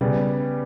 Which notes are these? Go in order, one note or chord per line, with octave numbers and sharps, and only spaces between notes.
C#3 G3 B3